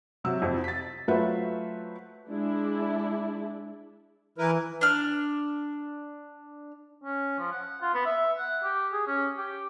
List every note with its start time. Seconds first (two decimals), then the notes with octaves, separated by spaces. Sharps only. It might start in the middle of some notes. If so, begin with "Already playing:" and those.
0.24 C3 F#3 E6
0.42 F2
0.64 A6 B6
1.08 F#3 A3 F4 B4 C5 E5
2.29 G#3 D4 E4
4.38 E3 E4 A#4 B4
4.81 D4 F6
7.03 C#4
7.39 F3
7.51 F#5
7.81 F4
7.94 B3
8.05 E5
8.38 F#5
8.64 G4
8.92 G#4
9.07 C#4
9.37 G4